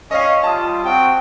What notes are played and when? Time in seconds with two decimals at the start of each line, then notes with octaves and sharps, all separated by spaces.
0.11 C#4 D#5 F5
0.44 G3 F4 A5 D#6
0.84 C4 F#4 G5